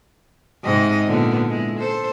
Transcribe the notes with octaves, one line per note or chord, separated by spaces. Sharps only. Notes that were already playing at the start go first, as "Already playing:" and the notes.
G#2 C3 D#5
A#2 D3 B3
G#3 E4
A4 C5